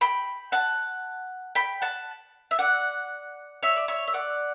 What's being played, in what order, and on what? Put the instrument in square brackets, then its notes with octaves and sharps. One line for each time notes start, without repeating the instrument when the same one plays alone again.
[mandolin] G5 B5
F#5 A5
G5 B5
F#5 A5
E5
D5 F#5
C#5 E5
D5
C#5 E5
E5
D5 F#5